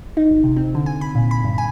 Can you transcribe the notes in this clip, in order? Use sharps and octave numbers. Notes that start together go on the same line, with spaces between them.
D#4
G#1
C3
C4
D3
G#5
B5
A#2
B5
G2
G#5